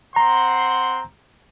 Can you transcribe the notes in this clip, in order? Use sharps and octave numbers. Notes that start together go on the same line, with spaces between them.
C4 F#5 A#5 C6